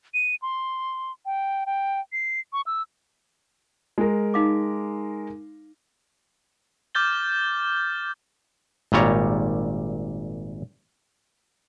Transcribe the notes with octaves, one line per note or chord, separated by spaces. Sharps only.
D#7
C6
G5
G5
C7
C#6
E6
G#3 A#4
D#4 F5 D6
D6 F6 G6 A6 G7
G#1 A#2 G3 C#5 A#5